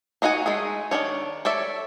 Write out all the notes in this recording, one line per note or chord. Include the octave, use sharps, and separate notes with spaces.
D4 D#4 F#4 F#5 G#5
G#3 A3 G#4
D#3 A3 D4 C#5
A4 C#5 D5 E5